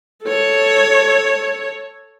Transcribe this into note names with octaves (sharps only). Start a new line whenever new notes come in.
A4 C#5